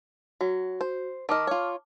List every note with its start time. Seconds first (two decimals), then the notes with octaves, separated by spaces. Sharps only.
0.41 F#3 F#4
0.81 C5
1.29 D#3 D#5 A5 D6 F6
1.47 F4 C#5